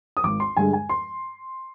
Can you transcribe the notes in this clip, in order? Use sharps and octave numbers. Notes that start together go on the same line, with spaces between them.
D#6
G#1 D6
C6
G2 D3 G#3 G#5
G#5
C6